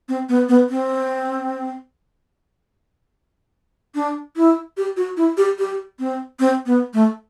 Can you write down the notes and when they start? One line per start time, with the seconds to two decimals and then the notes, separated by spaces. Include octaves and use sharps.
0.09 C4
0.29 B3
0.49 B3
0.69 C4
3.95 D4
4.36 E4
4.77 G4
4.97 F#4
5.17 E4
5.37 G4
5.59 G4
5.99 C4
6.40 C4
6.66 B3
6.94 A3